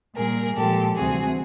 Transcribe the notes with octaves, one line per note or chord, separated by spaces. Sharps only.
A#2 G3 A#3 G#4 A#4
A#2 F3 G#3 G4 A4
D2 C3 E3 G3 C4 F#4 G#4